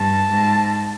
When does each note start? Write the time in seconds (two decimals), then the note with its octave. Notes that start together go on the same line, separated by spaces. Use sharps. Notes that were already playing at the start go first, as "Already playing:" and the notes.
Already playing: G2 A5
0.31 G#2